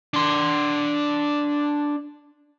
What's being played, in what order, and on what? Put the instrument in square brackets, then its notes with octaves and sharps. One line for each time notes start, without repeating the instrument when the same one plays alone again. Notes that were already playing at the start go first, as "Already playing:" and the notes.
[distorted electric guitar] D4 C6